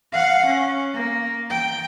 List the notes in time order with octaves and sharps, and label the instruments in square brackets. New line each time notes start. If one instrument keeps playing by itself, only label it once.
[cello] F5 F#5
C#4
A#3
G5